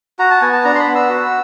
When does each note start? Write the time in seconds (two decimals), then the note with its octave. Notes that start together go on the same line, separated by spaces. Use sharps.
0.19 F#4 A#5
0.31 A5
0.42 B3 G#5
0.53 A5
0.64 D4 A#5
0.75 C6
0.80 B5
0.87 B3
0.95 E6
1.10 F#4